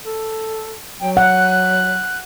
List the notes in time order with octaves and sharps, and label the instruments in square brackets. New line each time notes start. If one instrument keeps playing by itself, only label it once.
[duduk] A4
[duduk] F#3 [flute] G5
[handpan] F#5 [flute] F#6